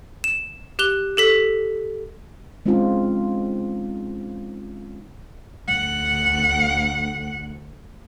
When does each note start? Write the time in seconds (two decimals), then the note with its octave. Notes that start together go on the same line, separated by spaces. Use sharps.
0.24 E7
0.79 G4 F#6 F7 G7
1.17 G4 A4 B6
2.66 G#3 C4 C#4 D#4 F4
5.68 D2 F#5